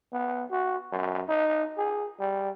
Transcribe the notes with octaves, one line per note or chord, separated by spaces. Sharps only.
B3
F#4
F#2
D#4
G#4
G3